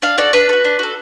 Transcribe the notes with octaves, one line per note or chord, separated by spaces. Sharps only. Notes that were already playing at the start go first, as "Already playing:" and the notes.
D4 F5
F#4 A4 D5
D4 B4
A4
F#4
D4
F#4 A4